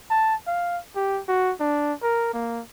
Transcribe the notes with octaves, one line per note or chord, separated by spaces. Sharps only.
A5
F5
G4
F#4
D4
A#4
A#3